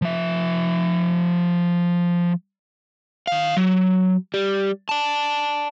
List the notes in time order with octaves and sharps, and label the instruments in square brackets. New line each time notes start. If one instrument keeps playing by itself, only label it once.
[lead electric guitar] F3 E5
[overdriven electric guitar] D#3 F5
F#3
G3
D5 A5